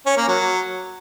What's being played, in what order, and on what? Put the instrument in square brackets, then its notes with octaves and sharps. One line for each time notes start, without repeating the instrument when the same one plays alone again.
[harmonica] C#4
A#3
F#3